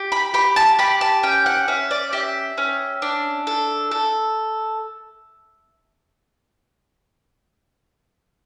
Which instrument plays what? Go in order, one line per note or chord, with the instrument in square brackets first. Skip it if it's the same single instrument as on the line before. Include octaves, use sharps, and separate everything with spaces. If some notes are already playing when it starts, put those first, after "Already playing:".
Already playing: [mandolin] G4
B5
G4 B5
A5
G4 B5
A5
C#4 G5
F#5
C#4 E5
D5
G4 E5
C#4
D4
A4
A4